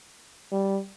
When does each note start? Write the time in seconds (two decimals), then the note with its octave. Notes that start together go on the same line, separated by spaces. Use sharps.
0.52 G3